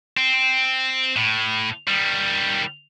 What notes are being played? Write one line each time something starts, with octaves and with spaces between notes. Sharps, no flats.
C4
A2
D#3 G3